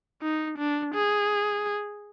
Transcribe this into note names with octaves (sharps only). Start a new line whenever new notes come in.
D#4
D4
G#4